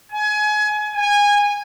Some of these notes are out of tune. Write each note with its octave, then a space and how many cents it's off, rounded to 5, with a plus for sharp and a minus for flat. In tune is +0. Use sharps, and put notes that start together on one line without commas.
G#5 +25
G#5 -20